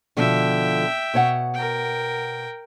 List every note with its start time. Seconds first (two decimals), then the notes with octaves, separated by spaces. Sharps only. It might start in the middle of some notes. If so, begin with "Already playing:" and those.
0.17 B2 D3 F3 E5 G5
1.14 B2 C#5 F#5
1.54 A#4 G5